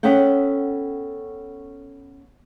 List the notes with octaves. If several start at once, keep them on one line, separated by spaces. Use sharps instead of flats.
B3 C#4 A4 F#5 G5